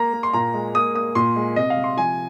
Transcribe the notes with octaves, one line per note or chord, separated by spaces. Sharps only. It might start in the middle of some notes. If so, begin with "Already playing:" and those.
Already playing: A#3 A#5
A#3
C6
A#2 A#5
G#3
A#3 D#6
A#3 D#6
A#2 C6
G#3
C3 D#5
F5
C3
C6
F3 G#5